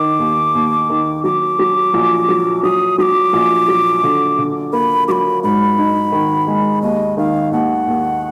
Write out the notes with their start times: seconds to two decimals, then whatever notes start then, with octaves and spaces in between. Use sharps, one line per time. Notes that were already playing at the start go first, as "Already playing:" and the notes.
Already playing: D#3 D6
0.19 D#2
0.55 D#2
0.89 D#3
1.24 F#3 D6
1.59 F#3
1.94 A#1
2.29 F#3
2.63 F#3 D#6
2.98 F#3 D#6
3.02 D6
3.33 A#1
3.68 F#3
4.03 D3
4.38 D3
4.73 A#3 B5
5.08 F#3 B5 D6
5.43 G#2 B5
5.78 D#4
6.12 D#3
6.47 G#3
6.82 D#2 D#5
7.17 D#3 F5
7.52 D#2 F#5
7.87 D#2